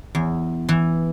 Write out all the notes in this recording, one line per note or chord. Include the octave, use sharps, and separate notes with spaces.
E2
E3